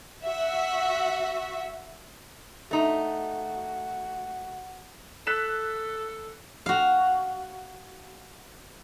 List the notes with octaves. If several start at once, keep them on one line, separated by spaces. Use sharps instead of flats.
F#4 E5
A3 D#4 F#4
A4 F#6 B6 E7
F#4 F5